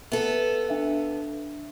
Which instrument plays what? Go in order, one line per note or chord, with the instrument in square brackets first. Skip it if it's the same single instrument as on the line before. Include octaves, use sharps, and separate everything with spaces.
[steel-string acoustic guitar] B3 A4 [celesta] E5
[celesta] D4 E5 F5